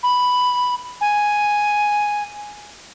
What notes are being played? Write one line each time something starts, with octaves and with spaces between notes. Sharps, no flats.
B5
G#5